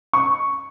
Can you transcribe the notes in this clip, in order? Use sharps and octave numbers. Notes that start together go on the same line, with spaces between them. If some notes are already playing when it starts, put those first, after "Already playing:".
C#6